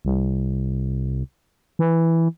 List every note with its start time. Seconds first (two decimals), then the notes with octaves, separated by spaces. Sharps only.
0.05 C2
1.79 E3